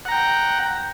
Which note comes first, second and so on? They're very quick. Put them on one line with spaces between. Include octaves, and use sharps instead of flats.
F#5 A#5 G5